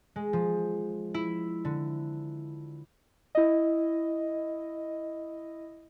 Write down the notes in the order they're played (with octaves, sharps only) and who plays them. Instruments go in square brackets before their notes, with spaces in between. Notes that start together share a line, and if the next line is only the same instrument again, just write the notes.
[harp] G#3
F3
E4
D3
[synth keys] E4 D#5